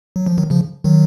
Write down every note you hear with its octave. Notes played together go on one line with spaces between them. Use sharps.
F#3
F3
D#3 F#3
C#3 F3
D#3 F#3